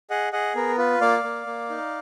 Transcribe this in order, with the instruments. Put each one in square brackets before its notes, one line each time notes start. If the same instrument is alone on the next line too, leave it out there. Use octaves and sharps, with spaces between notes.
[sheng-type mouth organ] G#4 D#5 F#5
G#4 D#5 F#5
B3 A#4
F4 B4
A#3 D5 F5
A#3
A#3
D#4